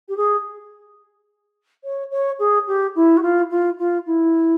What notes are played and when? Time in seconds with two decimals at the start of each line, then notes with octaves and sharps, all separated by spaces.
0.08 G4
0.17 G#4
1.84 C#5
2.11 C#5
2.39 G#4
2.67 G4
2.95 E4
3.17 F#4
3.22 F4
3.50 F4
3.78 F4
4.06 E4